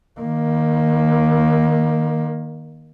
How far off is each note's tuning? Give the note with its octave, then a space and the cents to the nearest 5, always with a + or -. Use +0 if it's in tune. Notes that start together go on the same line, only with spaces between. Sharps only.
D#3 -5 A#3 +15